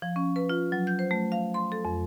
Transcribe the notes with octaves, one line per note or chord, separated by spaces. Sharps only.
F3
C#4
B4
F4
F#3
G6
C5
A3
F5
C6
A4
F2